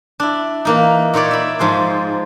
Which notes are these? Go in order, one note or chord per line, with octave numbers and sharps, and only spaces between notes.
D4 E4
E3 A#3 D#4
A#2 D#4 C#5 D5
E5 B5
G#2 F3 G#3 C5